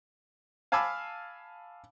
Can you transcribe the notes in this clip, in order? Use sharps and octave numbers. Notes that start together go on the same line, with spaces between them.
F5 G#5 A5 B5 D6 E6